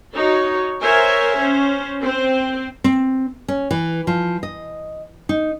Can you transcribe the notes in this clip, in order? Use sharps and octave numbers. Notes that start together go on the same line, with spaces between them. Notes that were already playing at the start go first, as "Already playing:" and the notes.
D#4 F#4 C#5
A#4 C5 C#5 E5 G#5
C#4 C5
C4 C5
C4
C#4
E3
F3
D#5
D#4